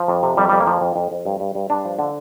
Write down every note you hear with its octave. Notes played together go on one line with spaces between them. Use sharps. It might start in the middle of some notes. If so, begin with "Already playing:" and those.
Already playing: F3
F2
C3
F2 G3
F2 G3
A#3
F3
F2
F2
F2
G2
G2
G2
G2 D4
F3
D3